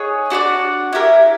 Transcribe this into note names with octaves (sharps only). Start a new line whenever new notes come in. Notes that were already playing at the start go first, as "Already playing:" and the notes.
Already playing: D#4 G#4 C#5 F#5
D4 F#4 B4 D5
E4 G4 A#4